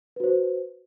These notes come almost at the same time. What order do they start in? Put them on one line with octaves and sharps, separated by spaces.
B4 F#4 C5